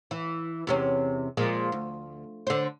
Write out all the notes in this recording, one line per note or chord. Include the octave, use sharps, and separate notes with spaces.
E3
E2 C3 C#4
A#2 F3 G#3
D2
D3 C5